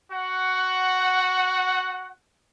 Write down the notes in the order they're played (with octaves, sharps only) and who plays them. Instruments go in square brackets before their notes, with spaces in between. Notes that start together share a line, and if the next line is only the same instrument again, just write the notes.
[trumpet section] F#4 F#5